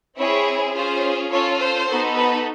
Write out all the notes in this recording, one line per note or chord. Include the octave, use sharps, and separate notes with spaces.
C4 E4 G#4 C#5
C#4 F4 G#4 C5
C#4 F4 A4 C#5
C5
B3 D#4 F#4 A4
B4